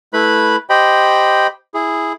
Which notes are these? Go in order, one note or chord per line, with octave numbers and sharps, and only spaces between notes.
A3 E4 B4 B5
G4 C5 D#5 G5 B5
E4 G#4